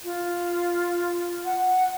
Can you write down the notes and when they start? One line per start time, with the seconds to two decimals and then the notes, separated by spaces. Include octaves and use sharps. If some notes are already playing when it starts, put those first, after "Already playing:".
0.04 F4
1.45 F#5